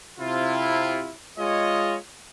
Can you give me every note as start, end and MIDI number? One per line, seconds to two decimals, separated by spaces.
0.20 1.12 48
0.20 1.12 64
0.20 1.12 65
1.38 1.96 56
1.38 1.96 65
1.38 1.96 73
1.38 1.96 75